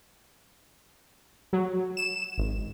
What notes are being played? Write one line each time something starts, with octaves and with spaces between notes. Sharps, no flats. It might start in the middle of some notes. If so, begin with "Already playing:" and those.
F#3
E7
G#1